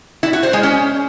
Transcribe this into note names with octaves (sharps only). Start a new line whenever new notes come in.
E4
F#4
C5
G#3
C#4